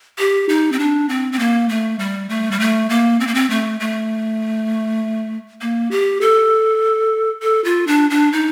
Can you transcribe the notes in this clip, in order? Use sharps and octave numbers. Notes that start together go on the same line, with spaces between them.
G4
D#4
C4
D4
C4
C4
A#3
A3
G3
A3
G3
A3
A#3
C4
A#3
C4
A3
A3
A#3
G4
A4
A4
F4
D4
D4
D#4